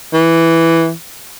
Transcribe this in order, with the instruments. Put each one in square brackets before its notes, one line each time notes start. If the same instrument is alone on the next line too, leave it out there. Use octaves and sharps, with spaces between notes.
[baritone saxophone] E3